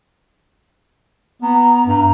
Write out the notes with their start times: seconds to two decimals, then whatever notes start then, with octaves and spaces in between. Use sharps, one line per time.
1.42 B3 A#5
1.87 G2